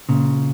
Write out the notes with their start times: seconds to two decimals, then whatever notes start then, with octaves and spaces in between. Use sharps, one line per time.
0.09 A#2 C#3